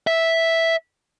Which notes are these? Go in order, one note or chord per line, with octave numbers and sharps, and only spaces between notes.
E5